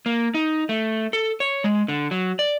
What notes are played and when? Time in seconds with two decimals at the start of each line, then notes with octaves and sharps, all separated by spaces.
0.06 A#3
0.34 D#4
0.69 A3
1.13 A4
1.40 C#5
1.64 G#3
1.88 D3
2.11 F#3
2.39 D5